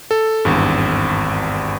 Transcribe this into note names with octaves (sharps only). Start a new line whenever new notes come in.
A4
G#1 E2 G2